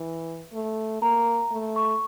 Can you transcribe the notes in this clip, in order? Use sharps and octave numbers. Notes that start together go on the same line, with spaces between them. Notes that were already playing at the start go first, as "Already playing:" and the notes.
Already playing: E3
A3
A#3 A#5
A3
C#6